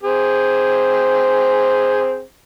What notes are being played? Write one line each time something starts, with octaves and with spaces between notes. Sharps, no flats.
C4 G#4 C5